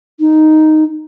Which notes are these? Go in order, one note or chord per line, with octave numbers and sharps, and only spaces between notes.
D#4